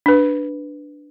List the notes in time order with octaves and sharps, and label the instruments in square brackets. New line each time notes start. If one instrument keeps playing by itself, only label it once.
[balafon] D4 B4